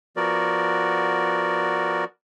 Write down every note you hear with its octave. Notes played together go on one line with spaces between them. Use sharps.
F3 B3 F#4 A#4 D5